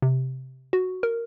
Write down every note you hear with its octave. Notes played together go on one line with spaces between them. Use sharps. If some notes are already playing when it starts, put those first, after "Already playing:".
C3
F#4
A#4